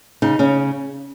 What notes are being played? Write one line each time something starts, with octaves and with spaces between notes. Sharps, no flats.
C#3 D#4
C#3 C#4